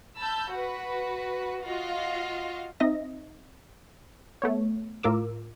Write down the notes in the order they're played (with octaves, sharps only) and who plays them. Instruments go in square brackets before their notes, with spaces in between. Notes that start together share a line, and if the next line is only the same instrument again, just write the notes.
[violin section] A5 B5 E6 G6
F#4 B4
F4 F#4 D#5 F5
[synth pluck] C4 D#4 D#5 E5 A#6
A3 B3 C#5
A2 F4 A#4 D6 E6